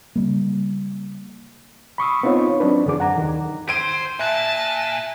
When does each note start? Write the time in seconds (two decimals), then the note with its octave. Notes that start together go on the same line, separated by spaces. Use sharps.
0.16 C#3 G3 A#3
1.98 B5 C#6 D#6 E6
2.23 B3 C4 D#4 F4 C#5
2.60 F#3 C4 D4 B4
2.86 F#2 D3 E3 G#4 D6
3.00 F#5 A#5
3.18 D#2 D#3
3.69 C5 C6 G#6 D7 D#7
4.19 A#2 E5 A5 F#6